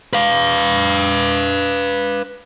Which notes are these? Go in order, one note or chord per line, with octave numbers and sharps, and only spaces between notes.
B4 F5